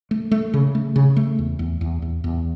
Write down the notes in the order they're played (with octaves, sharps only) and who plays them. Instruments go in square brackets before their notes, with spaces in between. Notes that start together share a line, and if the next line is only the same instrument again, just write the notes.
[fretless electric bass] A3
A3
C#3
A3
C#3
A3
E2
E2
E2
E2
E2